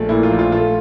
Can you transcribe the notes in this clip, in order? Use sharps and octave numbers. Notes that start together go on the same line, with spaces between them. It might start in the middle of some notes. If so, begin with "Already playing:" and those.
Already playing: A#1 A3
A#2 E4
F4
A#1
F4
A3 F4